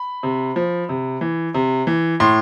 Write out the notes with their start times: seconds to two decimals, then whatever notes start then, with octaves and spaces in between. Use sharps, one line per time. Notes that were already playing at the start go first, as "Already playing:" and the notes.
Already playing: B5
0.23 C3
0.56 F3
0.89 C3
1.21 E3
1.54 C3
1.87 E3
2.20 A2 C6